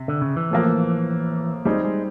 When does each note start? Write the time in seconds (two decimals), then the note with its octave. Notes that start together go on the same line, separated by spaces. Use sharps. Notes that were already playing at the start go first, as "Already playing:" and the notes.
Already playing: C3
0.08 D3
0.21 C#3
0.36 E3
0.50 A2 F3 A#3
1.65 G3 G#3 C4 D#4
1.85 G#3